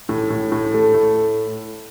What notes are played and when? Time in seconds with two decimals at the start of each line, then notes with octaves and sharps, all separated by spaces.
0.09 A2
0.30 A2
0.52 A2
0.74 A3
0.94 A2